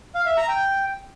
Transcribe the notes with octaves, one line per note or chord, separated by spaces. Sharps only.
F5
E5
A#5
G5